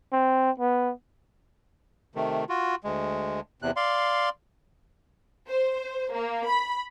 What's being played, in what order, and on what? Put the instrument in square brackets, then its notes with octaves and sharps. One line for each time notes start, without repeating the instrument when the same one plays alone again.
[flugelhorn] C4
B3
[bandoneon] C3 D#3 A3
F4 F#4
D2 G#3
E2 C3 F#6
D5 F5 C6
[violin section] C5
A#3
B5